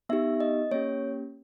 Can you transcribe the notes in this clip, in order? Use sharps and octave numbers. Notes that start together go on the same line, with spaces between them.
B3 D#4 G4 E5
D#5
A#3 C#4 G4 C#5